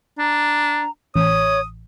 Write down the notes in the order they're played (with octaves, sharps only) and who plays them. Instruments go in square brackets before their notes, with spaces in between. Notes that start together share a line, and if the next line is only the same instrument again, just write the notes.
[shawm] D4 [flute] A#5
[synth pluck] A1 [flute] C#5 [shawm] D#6